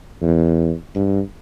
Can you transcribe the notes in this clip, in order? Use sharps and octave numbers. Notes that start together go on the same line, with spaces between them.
E2
G2